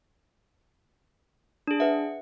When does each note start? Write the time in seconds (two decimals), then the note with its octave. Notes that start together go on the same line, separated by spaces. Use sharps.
1.67 D4 G#4
1.80 B4 E5 F#5